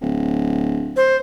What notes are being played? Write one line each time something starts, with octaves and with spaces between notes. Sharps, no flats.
D1
C5